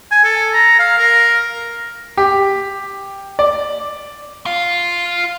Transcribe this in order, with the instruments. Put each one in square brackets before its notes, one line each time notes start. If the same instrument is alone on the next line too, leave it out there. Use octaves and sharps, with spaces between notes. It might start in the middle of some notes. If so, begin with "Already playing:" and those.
[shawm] G#5
A4
A#5
F5
A#4
[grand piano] G4
D5
[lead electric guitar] F4 F5